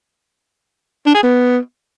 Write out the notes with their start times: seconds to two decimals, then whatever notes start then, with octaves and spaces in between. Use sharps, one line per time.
1.06 D4
1.14 G#4
1.23 B3